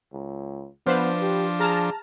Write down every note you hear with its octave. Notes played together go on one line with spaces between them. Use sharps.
C#2
F3 B3 D4 B4 C5 F5
G4
G#4 A5 A#5 F6